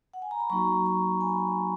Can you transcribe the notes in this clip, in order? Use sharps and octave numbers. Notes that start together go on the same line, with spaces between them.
F#5
G#5
A#5
B5
F#3 A#3 D#4 F#4 A#5 C#6
A#5 C#6
G#5 B5